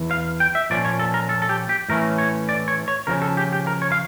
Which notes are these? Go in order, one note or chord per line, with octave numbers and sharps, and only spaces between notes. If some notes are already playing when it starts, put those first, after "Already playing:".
Already playing: E2 E3
F5
G5
E5
A#2 F3 C#4 D5
C#5
A4
A#4
A4
A4
G4
G4
A2 E3 A3 C#4 A#4
C#5
D5
C#5
C#5
C#3 F3 C#4 A#4
A4
G4
G4
A#4
C#5
F5